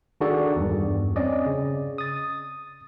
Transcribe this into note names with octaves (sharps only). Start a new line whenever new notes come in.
D#3 D4 F#4 G#4 A4 D5
E2 G2
C4 C#4 D5 D#5
C#3
D#6 A6